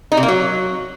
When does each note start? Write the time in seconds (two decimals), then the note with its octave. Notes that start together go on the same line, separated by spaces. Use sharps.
0.12 D#4
0.17 C3
0.23 A#3
0.28 F#3